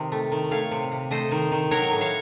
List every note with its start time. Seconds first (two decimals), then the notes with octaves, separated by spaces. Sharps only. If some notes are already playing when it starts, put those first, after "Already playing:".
Already playing: C3 D#3
0.12 A3
0.32 D#3
0.51 A3 C#5 F5
0.71 C3
0.91 C3
1.11 A3 C5 D#5
1.32 D#3
1.52 D#3
1.71 F#3 A#4 C#5
1.91 A2
2.01 C#5 F5